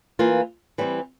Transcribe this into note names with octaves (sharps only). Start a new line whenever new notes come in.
E3 A#3 F4
E3 G3 C4